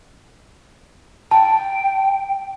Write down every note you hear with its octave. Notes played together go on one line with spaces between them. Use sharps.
G5 A5